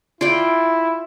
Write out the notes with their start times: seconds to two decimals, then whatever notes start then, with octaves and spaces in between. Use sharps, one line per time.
0.21 E4 F4 D5 G5